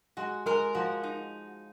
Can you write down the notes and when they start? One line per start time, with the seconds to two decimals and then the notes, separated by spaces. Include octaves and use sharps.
0.17 G#3 F#4
0.46 G#3 A#4
0.75 F3 F#4
1.03 D#4